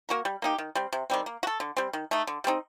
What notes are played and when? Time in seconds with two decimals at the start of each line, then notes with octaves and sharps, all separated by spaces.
0.09 A#3 F#4 A#4
0.25 G3
0.42 A#3 D#4 G4
0.58 D#3
0.75 G3 C4
0.93 C3
1.10 D#3 G3 C4
1.26 A#3
1.43 F#4
1.47 A4
1.60 D3
1.77 G3 C4
1.93 D#3
2.11 A3 D#4
2.27 D3
2.44 G3 C4 D#4